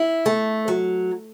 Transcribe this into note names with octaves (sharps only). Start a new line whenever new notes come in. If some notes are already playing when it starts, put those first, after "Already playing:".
Already playing: E4
A3
F#3